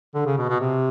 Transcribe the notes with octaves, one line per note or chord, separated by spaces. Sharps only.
D3
C#3
B2
B2
C3